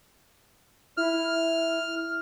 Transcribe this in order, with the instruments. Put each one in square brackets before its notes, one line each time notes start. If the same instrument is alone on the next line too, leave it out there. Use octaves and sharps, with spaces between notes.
[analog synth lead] E4 [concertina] F6